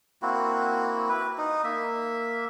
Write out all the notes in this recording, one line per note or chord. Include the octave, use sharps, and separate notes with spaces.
A#3 C4 E4 F#4
E4 B4
D#4
A#3 E5